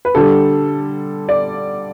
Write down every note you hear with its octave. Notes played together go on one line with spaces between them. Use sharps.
B4
D3 G3 A4
D5